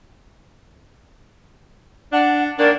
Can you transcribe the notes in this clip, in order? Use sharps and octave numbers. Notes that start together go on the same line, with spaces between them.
D4 F#5
D#3 A#3 D4 D5